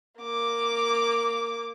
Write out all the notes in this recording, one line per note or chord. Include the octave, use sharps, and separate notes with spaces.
A#3 D6